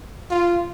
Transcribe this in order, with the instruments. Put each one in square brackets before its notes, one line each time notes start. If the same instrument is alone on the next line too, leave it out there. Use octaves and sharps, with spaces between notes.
[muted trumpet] F4